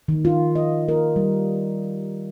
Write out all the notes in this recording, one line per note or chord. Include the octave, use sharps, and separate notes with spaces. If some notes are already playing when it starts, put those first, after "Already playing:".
D#3
F4
D#5
A#4
G3